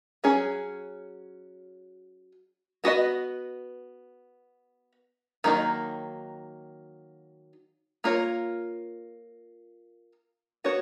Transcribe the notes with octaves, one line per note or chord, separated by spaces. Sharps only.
F#3 C#4 G#4
B3 F#4 B4 D#5
D#3 F#3 A#3 D#4
A#3 F4 A#4 C#5
B3 F#4 C#5